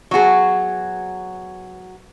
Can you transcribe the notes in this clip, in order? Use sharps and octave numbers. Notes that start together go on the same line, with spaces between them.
F#3 B3 F#4 G#4